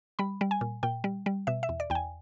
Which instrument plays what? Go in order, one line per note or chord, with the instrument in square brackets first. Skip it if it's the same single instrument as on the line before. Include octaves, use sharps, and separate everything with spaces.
[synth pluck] G3 B5
G3
G#5
A#2
A#2 G5
G3
G3
B2 E5
E5
E2
D5
E2 G5
G#5